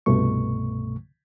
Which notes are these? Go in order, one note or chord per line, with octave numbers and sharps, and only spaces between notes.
C2 G2 B2 A3 C#6